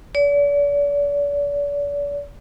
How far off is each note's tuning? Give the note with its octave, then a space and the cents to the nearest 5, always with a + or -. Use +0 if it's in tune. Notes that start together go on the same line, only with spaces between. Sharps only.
D5 -40